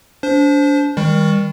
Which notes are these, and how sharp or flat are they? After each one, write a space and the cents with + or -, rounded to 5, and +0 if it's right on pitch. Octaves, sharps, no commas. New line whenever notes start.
D4 -30 C5 +0
D#3 +30 G3 +35